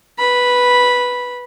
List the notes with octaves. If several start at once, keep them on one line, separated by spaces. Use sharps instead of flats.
B4 B5